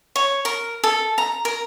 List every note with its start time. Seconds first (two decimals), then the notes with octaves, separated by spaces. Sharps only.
0.16 C#5
0.45 A#4
0.84 A4
1.18 A#5
1.45 A#4